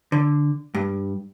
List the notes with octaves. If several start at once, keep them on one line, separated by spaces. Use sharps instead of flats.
D3
G2